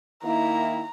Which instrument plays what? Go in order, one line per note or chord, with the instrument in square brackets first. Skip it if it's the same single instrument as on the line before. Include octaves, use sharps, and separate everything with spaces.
[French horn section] D#3 A#3 E4 [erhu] A#5